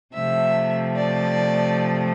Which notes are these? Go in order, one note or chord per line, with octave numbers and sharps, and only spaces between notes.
C3 F3 A3 E5
D5